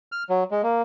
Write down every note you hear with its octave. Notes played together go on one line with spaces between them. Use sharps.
F6
F#3
G#3
A#3